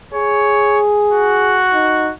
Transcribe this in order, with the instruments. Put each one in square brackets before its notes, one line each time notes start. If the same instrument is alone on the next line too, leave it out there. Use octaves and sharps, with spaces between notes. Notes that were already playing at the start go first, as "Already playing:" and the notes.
[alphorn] G#4 [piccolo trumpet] C#5
[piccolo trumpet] F#4
[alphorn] D#4